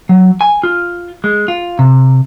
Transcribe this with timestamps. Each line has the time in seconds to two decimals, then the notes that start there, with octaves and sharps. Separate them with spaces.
0.09 F#3
0.41 G#5
0.63 F4
1.24 G#3
1.48 F4
1.79 C3